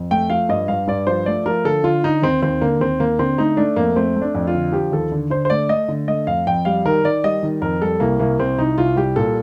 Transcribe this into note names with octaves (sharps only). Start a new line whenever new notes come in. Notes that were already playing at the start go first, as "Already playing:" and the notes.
Already playing: F2
A3 G5
F3 F5
G2 D#5
G2 F5
G2 D5
F3 C5
A3 D5
F3 A#4
D3 A4
D3 F4
D3 D#4
D#2 C4
D#2 C4
D3 A#3
D#2 C4
D#2 A#3
D3 C4
A3 D#4
A3 D4
F2 A#3
A3 C4
A3
D4
F2
F4
D3
F3 G4
D#2 A4
D3
D3 C5
C5
A3 D5
A3 D#5
D3
A3 D#5
F2 F5
F2 G5
G3 F5
D#3 A#4
D#3 D5
G3 D#5
D#3
F2 A#4
G3 A4
C2 A#3
C2 A#3
C2 C4
C2 D#4
C2 F4
G3 G4
A#2 A4